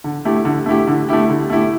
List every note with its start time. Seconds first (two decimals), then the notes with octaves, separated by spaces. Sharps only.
0.04 D3
0.25 A3 E4 G4
0.45 D3
0.66 A3 E4 G4
0.88 D3
1.09 A3 E4 G4
1.29 D3
1.50 A3 E4 G4